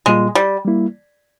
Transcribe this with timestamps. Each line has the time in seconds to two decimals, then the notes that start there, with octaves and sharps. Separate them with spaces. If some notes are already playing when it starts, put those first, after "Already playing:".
0.06 A#2 G3 G#3 A#3 F4
0.35 G3
0.65 G3 A#3 E4